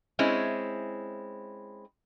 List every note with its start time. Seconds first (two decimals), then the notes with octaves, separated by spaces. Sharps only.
0.19 G#3 C4 C#4 E4